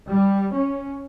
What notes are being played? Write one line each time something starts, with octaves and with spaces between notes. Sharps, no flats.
G3
C#4